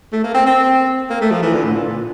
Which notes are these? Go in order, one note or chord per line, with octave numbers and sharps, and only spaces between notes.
A3
A#3
C4
C4
A#3
A3
F3
E3
D3
A2
A#2